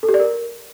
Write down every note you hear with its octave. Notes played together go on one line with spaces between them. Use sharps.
A4
G4
D5
A#4